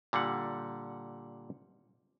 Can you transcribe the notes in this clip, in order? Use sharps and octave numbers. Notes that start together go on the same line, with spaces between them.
A#2 D3 G3 F#5